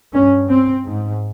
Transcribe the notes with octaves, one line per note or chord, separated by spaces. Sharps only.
G2 C#4
C4
G#2